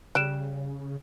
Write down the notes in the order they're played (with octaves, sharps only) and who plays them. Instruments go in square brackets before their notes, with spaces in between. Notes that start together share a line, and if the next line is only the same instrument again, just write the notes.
[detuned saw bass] C#3 [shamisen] G3 [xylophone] F#6 D7 E7